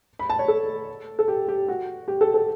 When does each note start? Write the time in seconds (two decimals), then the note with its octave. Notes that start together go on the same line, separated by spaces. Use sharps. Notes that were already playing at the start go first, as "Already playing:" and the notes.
0.19 B5
0.30 A5
0.39 C#5
0.48 A4
1.19 A4
1.28 G4
1.48 G4
1.68 F#4
2.08 G4
2.21 A4
2.34 A4